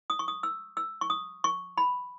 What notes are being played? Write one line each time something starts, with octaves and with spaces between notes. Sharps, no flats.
D#6
C#6
D#6
E6
E6
C#6
D#6
C#6
B5